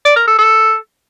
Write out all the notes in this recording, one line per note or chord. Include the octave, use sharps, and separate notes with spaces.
D5
A#4
A4
A4